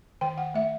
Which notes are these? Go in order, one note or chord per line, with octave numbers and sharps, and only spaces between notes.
D#3 G5
F#5
A3 E5